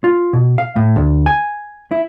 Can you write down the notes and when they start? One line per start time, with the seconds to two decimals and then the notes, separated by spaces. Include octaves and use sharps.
0.04 F4
0.33 B2
0.58 F5
0.76 A2
0.96 D2
1.26 G#5
1.91 E4